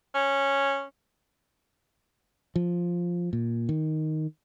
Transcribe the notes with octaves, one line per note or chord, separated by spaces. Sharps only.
C#4
F3
A#2
D#3